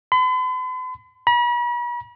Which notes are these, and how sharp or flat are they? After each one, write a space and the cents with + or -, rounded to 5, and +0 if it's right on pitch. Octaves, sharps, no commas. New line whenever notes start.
B5 +45
B5 -45